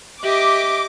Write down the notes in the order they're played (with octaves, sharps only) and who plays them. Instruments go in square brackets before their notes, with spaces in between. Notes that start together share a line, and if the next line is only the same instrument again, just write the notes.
[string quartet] G4 D#5 E5 [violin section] D6